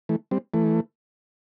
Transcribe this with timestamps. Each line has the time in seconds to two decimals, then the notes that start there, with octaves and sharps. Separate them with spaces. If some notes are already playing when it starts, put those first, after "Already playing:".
0.09 E3 A3
0.31 G3 C4
0.54 E3 A3